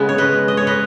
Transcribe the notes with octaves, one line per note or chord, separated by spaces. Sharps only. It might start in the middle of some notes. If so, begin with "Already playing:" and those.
Already playing: C#3 G#3 B3
C#5
B4 D#5
D#5
C#5
B4 D#5